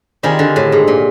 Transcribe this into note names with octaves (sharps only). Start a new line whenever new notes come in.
D#3 G3 C4 F4 G#4
D3
A2
G#2
A#2